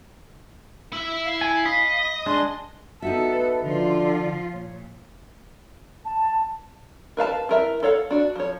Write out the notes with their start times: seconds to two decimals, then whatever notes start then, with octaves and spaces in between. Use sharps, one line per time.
0.93 E4 E5
1.25 F5
1.41 G#5
1.66 D#5 B5
2.26 G#3 D4 C6
3.02 B3 D#4 F#4 A4 E5
3.32 B4
3.63 D3 F3 F4
4.53 A#2 C#5
6.05 A5
7.17 A#4 B4 F5 A5
7.49 E3 A#4 E5
7.83 A4 C#5 F5 F#5
8.11 D4 F#4
8.36 F3 C#5